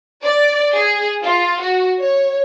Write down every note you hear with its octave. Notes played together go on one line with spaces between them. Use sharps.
D5
G#4
F4
F#4
C#5